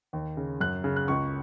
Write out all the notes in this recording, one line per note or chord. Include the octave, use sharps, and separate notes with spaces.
D#2
C#3
F#2 F#6
C#3
F#6
C#2 C#6